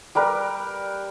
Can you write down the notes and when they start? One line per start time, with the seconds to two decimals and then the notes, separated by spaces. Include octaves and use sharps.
0.15 G3 G4 A#4 B4